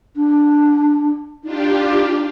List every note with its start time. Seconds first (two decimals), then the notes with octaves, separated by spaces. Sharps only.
0.15 D4
1.43 D4 D#4 F4 G4